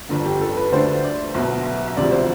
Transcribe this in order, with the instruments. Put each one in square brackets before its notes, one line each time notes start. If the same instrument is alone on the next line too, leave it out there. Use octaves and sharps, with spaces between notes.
[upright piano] G1 F2 D3
G4
A4
B4
D2 D3 A3 D4 C5
D5
B1 B2 B3 E5
E5
E5
E1 D2 C3 F3 D5
C5